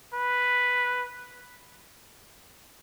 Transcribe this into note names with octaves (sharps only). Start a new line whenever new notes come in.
B4